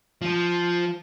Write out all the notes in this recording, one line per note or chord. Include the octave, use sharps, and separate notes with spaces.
F3